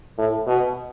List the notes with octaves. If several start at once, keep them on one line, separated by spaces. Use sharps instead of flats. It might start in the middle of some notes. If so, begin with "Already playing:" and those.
A2
B2